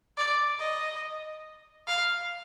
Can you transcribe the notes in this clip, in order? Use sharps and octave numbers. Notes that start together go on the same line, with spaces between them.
D5
D#5
F5